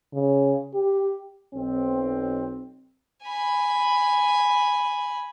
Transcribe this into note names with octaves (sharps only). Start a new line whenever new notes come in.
C#3
G4
B1 C4
G#5 B5